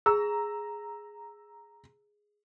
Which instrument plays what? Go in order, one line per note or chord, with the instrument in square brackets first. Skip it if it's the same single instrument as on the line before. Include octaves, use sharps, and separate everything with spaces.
[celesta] G#4 [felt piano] A#5 E6